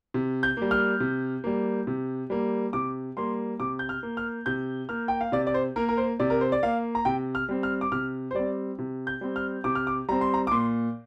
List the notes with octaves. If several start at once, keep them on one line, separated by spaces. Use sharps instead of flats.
C3
G6
G3 A#3
F6
C3
G3 A#3
C3
G3 A#3
C3 D6
G3 A#3 C6
C3 D6
G6
F6
A#3
F6
C3 G6
A#3 F6
G5
F5
C3 D5
D5
C5
A#3 A#4
A#4
C5
C3 D5
A#4
C5
D5
A#3 F5
A#5
C3 G5
F6
G3 C4
F6
D6
C3 F6
C5
G3 C4 D5
C3
G6
G3 C4
F6
C3 D6
F6
D6
G3 C4 A#5
C6
A#5
D6
A#2 C6